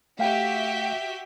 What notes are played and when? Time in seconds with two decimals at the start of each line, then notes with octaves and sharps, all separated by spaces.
0.19 A3 F#4 G4 E5 F5 G5